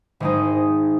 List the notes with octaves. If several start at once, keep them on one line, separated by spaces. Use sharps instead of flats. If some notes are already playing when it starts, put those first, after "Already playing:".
G#1 G#3 D#4